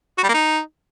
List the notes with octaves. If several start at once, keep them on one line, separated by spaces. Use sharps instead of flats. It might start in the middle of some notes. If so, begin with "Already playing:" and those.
F#4
G3
A#3
D#4